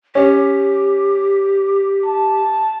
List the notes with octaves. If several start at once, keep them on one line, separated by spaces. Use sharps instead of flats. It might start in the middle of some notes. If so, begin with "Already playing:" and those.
C#4 G4
A5